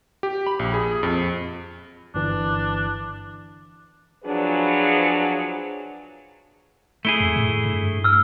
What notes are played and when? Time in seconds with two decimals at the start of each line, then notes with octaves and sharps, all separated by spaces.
0.23 G4
0.46 B5
0.59 A#1
0.74 G#4
1.03 F2
2.15 G1 E3 D4
4.24 F3 F#3 D4 G#4 B4
7.05 A3 E4 G#4 G7
7.20 F2
7.36 A2
7.66 G2
8.04 E6 F6